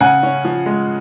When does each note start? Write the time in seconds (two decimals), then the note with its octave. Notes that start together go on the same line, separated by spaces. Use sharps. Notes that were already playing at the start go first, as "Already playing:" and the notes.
0.01 C#3 F#5 G#5
0.23 C#4
0.45 F3
0.66 G#3